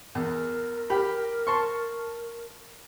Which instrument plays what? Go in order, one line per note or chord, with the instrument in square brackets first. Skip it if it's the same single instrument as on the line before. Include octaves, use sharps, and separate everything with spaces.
[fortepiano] E2 [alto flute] A#4
[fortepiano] G4 B5
A5 C6 C#6